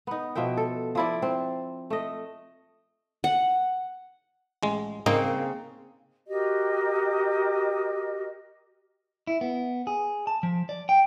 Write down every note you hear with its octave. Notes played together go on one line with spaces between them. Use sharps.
B3 D#4
B2 F3 E5 G5
A4
F3 E4 D5
C4
A3 D#5
F#5
A1 G#3
C#3 A#3 C4 D#4
F#4 G4 A#4 D#5
E4
B3
G#4
A5
F3
D5
G5